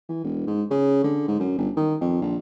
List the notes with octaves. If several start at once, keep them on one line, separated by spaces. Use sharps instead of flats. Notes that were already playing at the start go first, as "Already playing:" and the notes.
E3
E1
G#2
C#3
D3
G#2
F#2
G1
D#3
F2
A#1